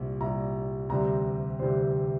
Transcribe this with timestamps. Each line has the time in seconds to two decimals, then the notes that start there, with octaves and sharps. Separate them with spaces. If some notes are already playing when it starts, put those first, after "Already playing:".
Already playing: C2 A#2 G3
0.20 C2 A#2 G3 A#5
0.89 D2 C3 E3 G3 C4 A#5
1.59 D2 C3 E3 G3 C4 C5